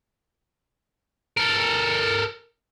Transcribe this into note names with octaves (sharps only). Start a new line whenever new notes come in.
A4 A#4